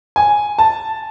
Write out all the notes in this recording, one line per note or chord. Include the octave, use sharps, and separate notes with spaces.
G#5
A5